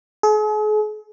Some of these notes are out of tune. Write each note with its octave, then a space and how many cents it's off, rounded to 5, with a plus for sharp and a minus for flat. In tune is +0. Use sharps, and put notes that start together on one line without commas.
G#4 +45